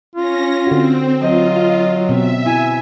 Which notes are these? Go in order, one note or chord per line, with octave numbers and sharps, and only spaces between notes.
C#4 F4 A#6
D3 C4 F#4
F#3 F4 D#5
B2 C4 E5
E4 G#5